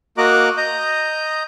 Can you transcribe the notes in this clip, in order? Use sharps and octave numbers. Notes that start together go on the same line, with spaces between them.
A#3 F#4 D#5 A#5 D6 F#6
D#5 A#5 D#6 G6